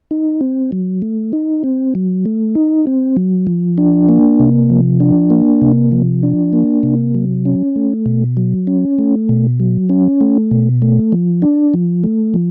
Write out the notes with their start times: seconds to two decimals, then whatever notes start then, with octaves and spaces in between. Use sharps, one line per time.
0.11 D#4
0.41 C4
0.72 F#3
1.02 A3
1.33 D#4
1.64 C4
1.95 F#3
2.26 A3
2.55 D#4
2.87 C4
3.17 F#3
3.47 F3
3.78 D4
4.09 A#3
4.40 C3
4.70 F3
5.00 D4
5.30 A#3
5.62 C3
5.92 F3
6.23 D4
6.53 A#3
6.83 C3
7.15 F#3
7.45 C#4
7.76 A3
8.06 B2
8.37 F#3
8.67 C#4
8.99 A3
9.29 B2
9.60 F#3
9.90 C#4
10.21 A3
10.51 B2
10.82 A3
11.12 F3
11.42 D4
11.74 F3
12.04 A3
12.34 F3